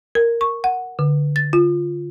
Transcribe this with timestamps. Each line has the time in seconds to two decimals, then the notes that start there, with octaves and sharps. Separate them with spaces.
0.15 A#4
0.41 C#6
0.64 F#5
0.99 D3
1.36 A6
1.53 F4